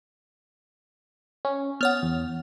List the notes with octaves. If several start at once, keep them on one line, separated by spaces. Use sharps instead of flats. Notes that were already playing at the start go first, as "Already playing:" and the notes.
C#4
B3 C#5 F#5 F6
E2